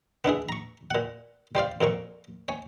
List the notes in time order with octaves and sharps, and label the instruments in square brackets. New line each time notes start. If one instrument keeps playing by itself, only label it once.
[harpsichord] B3 D4 E4 G#4
A#5 C#6
A#2 F#5
G3 C5 D5 F5
F2 A#2 A#3 C#6
C#5 G#5